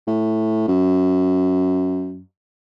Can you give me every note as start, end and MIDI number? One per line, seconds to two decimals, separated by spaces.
0.07 0.67 45
0.68 2.20 42